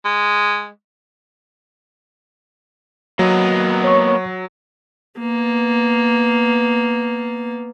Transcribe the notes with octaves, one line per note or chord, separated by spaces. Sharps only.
G#3
F#3 A#3 B3 D#5
C#5 C#6
A#3 B3